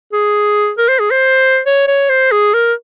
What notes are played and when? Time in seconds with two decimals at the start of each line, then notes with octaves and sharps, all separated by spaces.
0.13 G#4
0.78 A#4
0.88 C5
0.99 G#4
1.11 C5
1.66 C#5
1.88 C#5
2.10 C5
2.32 G#4
2.54 A#4